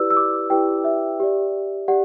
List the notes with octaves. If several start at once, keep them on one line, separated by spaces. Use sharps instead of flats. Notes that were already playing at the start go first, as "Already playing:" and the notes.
Already playing: E4 G4 B4 D5 E6
E6
D6
E4 G4 B4 D5 G5
E5
G4 D5
G4 D5 F#5